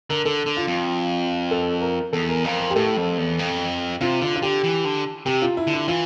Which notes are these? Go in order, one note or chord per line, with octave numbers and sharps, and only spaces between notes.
D3 A#4
D3 A4
D3
F4
F2
A4
A#4
E2 A4
A#4
F2 A#4
A#4
G4
A2 A4
F2
E2
F2
C3 F4
D3 F4
F4
D3 G4
E3
D3
C3 G4
F4
E4
D3
E4
E3 F4